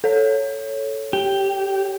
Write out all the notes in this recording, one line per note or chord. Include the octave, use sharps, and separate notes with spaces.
A4 C#5
G4